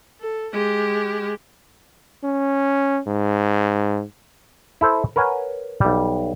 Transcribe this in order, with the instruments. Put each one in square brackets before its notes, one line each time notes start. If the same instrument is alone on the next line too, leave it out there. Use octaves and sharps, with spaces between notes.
[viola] A4
G#3 G4
[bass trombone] C#4
G#2
[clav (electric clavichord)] E4 A4 C5
A#4 B4 C#5 F#5 G#5
B1 G3